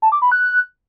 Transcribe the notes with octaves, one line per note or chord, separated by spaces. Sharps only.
A5
D6
B5
F#6